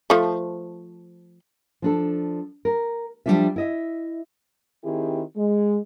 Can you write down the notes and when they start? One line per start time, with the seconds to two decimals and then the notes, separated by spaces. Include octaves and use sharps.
0.10 F3 A3
1.82 F3 D4 A4
2.65 A#4
3.26 F3 G3 A3 D4 F4 E5
3.56 E4 D#5 E5
4.84 D#3 C4 E4 G4 G#4
5.37 G#3